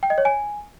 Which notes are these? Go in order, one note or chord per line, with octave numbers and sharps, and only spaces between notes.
G5
D#5
C#5
G#5